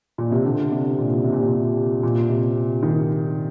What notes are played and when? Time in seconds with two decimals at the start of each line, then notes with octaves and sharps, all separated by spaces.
0.18 A#2
0.32 C3
0.45 D3
0.72 C3
0.98 A#2
1.24 C3
1.32 A#2
1.42 C3
2.03 A#2
2.29 C3
2.83 D#3